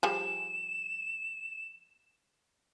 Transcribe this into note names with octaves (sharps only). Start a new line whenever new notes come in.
F3 G3 G#4 E7